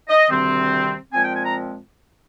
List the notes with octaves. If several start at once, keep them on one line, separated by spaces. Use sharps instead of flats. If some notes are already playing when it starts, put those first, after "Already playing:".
D#5
D2 C3 D#3 G3 C4
A#2 F3 G#3 C4 G#5
G5
G#5
A#5